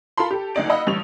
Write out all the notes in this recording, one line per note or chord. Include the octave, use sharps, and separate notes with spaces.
F4 A4 A#4 B5 C6
G4 A4
F#1 D2 D#4 D5 D7
D#5 F5 F#5 B5 D#6 E6
A1 G2 G3 C#6 F7